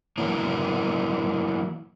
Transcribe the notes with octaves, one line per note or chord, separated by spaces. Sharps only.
E3 F#3 A#3 B3 E4 A#4